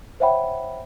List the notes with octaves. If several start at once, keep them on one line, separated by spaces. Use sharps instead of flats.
C5 C#5 E5 F#5 G5 B5